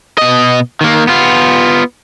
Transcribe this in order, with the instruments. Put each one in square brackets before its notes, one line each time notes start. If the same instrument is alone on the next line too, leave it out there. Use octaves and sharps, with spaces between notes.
[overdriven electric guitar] B2 D#5
D#3 A#3
B3 F4